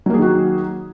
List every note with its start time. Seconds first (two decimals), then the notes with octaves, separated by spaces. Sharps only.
0.06 F#3
0.10 A#3
0.14 G#4
0.18 D#3
0.22 F#4